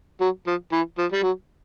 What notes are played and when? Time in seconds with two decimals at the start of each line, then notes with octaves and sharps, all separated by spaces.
0.21 F#3
0.47 F3
0.72 E3
0.98 F3
1.12 G3
1.23 F#3